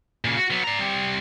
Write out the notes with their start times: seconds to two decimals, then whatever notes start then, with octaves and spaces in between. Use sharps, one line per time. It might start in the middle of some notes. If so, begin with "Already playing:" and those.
0.25 A#2 C#3
0.37 F#4
0.51 F#3 B3
0.64 D5 A#5
0.79 G3 C4